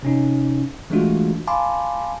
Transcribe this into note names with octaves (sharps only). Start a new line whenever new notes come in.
C3 C#4 D#4
E3 G#3 A3 D4 F4 F#4
F5 G#5 A5 B5 C6 D6